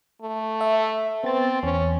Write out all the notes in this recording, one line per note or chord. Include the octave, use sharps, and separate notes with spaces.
A3
E5
B3 C4 A6
E2 C#4